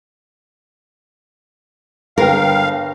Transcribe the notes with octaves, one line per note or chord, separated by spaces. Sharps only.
G1 A#4 B4 F5 G5